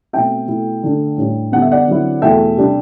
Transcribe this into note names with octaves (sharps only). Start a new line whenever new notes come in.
B2 A3 C4 E5 G5
B2 A3 E4
D3 A3 D4
A2 G3 D4
D3 G3 B3 F#5
E5
D5 F#5
D3 F#3 C4 E4
E2 B2 A3 E4 E5 G5
C3 G3 D4